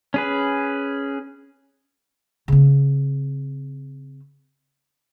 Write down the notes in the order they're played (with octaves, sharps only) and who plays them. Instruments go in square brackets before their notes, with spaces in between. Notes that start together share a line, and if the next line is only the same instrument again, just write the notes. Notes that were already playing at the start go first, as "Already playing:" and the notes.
[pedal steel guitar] C#4 G#4 B4
[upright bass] C#3 C4